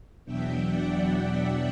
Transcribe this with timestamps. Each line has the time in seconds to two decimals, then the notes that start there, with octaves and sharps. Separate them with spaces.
0.25 E2 B2 F#3 B3 D4 E5 G5
0.66 D5 F#5